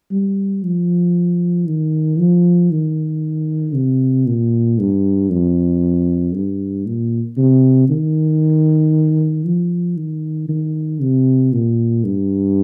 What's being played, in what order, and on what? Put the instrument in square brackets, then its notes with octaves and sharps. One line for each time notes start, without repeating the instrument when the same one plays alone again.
[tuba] G3
F3
D#3
F3
D#3
C3
A#2
G2
F2
G2
A#2
C3
D#3
F3
D#3
D#3
C3
A#2
G2